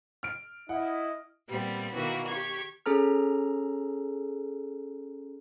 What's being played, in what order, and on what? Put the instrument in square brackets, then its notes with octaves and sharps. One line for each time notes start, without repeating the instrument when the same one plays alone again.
[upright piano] F6 D7
[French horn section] E4 [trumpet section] D#5 [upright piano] F#5
[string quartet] A#2 G3 B3 C4
B2 D#3 E3 A#3 F#4
G4 C#6 G#6
[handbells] C#4 G#4 A4 A#5 F6